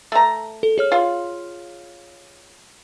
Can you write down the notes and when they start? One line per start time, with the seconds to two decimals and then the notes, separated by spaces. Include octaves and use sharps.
0.12 A3 A#5
0.63 A4
0.78 G#4 C#5 F6
0.92 F4